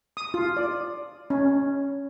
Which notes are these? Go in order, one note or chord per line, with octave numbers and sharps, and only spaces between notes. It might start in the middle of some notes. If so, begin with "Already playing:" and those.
D#6
F4
D5
C#4